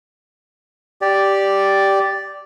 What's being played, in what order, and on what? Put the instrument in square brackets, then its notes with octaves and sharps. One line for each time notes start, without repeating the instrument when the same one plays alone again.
[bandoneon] G4 D5